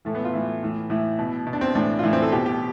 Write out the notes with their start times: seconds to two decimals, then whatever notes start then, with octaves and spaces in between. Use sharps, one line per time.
0.05 A2 E3 A3
0.15 B3
0.24 F4
0.33 A2 E3 E4
0.63 A2 E3
0.90 A2 E3 E4
1.19 B2
1.47 B2
1.53 D4
1.61 C4
1.75 A2 E3 D4
1.99 F4
2.03 A2 E3 E4
2.13 C4
2.22 A4
2.32 B2 G4
2.46 G4